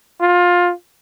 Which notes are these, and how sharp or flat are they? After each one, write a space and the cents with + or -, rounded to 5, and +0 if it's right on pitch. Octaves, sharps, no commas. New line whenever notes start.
F4 +20